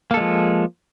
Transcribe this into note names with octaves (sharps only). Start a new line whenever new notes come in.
F3 G#3 A#3 A4